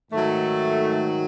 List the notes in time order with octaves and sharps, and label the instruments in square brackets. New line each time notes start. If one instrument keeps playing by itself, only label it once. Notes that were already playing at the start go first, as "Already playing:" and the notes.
[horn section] G#2 D#3 F#3 A3